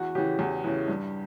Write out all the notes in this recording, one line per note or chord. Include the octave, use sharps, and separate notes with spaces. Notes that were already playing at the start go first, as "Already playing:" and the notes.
Already playing: E2 F#4
C#3 E3 G4
E2
C#3 E3
G2